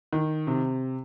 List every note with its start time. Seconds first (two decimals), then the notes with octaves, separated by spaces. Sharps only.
0.13 D#3
0.47 C3